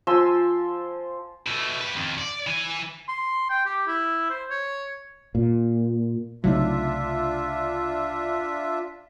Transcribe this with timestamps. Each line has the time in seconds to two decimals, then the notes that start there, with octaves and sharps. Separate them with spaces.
0.07 F3 G#5 C6 E6
1.47 B2 A3
1.81 G3 B4
1.95 F2 D#3
2.19 D5
2.47 E3 G#5
3.09 C6
3.50 G5
3.66 G4
3.87 E4
4.30 C5
4.51 C#5
5.35 A#2
6.44 C2 C#3 F#3 A3 D4 D#4 F4 E5